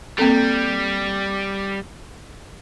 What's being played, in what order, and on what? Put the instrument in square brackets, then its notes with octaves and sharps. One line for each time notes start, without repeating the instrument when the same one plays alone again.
[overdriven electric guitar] G3 [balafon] A#3 C4 A4